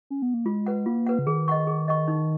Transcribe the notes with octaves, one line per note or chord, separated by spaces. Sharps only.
C#4
B3
A#3
G#3 F4
B4 F#5
A#3 F4
B4 F#5
C#3
D#3 G#4
D#5 F#5 C#6
G#4
D#5 F#5 C#6
D#4